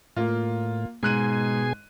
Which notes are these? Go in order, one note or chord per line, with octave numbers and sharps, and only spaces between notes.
A2 A#3 F4
G#2 B2 G#4 G#5 F#6 D#7